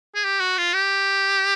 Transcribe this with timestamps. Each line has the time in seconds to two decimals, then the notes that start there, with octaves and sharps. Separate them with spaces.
0.15 G#4
0.24 G4
0.40 F#4
0.58 F4
0.74 G4